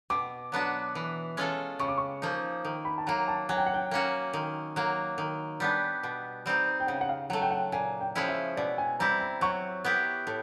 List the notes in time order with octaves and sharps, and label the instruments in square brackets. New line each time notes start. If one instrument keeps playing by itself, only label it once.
[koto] B2 [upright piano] D6
[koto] F#3 B3 D4 F#4
E3
G#3 C#4 F4 A4
[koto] C#3 [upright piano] C#6
[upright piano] D6
C#6
[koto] F3 A#3 D#4
D#3
[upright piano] B5
A5
[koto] F#3 A#3 [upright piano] A#5
[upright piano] A5
[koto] F#3 [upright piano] G#5
[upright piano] G5
F#5
G5
[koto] A#3 C#4 F#4
D#3
F#3 A#3
D#3
G3 B3 D4
B2
G3 C4 D#4
[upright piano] G5
[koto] C#3 [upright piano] F#5
[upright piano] F#5
F5
[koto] F#3 A3 [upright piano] F#5
[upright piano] G5
F#5
[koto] A#2 [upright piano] G#5
[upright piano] G5
[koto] F3 G#3 C#4 E4
[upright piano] E5
[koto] B2 [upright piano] D5
[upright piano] G#5
[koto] G3 C4 E4 [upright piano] A#5
[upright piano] A#5
[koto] F#3 [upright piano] C#6
[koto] B3 E4 G4
A2